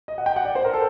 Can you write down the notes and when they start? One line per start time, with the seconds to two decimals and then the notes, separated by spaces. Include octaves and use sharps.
0.08 D#5
0.18 F#5
0.26 G5
0.36 F#5
0.45 D5
0.55 C5
0.65 A#4
0.73 A4